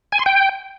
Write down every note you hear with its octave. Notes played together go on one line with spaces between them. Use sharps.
G#5
C6
G5